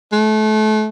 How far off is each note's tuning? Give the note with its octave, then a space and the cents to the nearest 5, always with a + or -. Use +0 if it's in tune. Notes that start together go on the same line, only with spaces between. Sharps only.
A3 -30